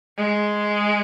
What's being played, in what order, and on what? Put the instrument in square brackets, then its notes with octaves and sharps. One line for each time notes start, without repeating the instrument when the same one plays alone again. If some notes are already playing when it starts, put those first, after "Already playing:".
[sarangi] G#3